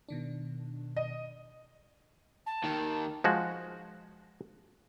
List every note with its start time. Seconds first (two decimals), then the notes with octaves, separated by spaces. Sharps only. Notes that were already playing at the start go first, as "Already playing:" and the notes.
0.08 B2 D#3 D4
0.96 D#5
2.46 A5
2.64 D#2 D#3
3.24 F3 G#3 F#4